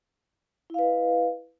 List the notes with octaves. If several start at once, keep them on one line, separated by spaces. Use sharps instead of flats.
E4 B4 D#5 F5